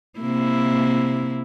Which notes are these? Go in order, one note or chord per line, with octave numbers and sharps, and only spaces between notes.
C3 A#3 E4